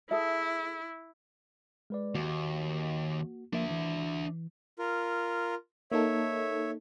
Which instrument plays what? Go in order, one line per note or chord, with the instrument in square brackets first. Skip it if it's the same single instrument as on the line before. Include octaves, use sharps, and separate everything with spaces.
[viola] E4 [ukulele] G#4 A4 E5
[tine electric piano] G#3 B4 D5
[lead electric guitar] D#2 [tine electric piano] A#3 F#4
[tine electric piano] F3 A#3 [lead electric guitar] D4 E5
[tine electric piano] E3
[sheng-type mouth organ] F4 A#4
[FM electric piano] A#3 D#4 A4 [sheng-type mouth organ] C#5 E5